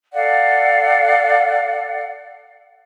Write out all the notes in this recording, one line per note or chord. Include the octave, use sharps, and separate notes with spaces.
A4 D5 F5 F#5